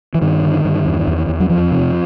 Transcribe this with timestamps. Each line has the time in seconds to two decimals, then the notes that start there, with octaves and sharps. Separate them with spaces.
0.15 E3
0.21 G2 D#3
0.43 D3
0.65 G2
0.85 E2
1.07 E2
1.29 E2
1.40 F#3
1.50 F2 F3
1.71 C3